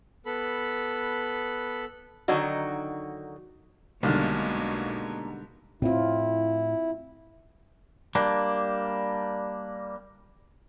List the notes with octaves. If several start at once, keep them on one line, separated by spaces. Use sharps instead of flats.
B3 A4 B5
D3 D#3 F#3 D#4 F#4
B1 B2 D3 D#3 G3 G#3 A#3 D4
A2 C4 E4 F4
G3 A#3 D4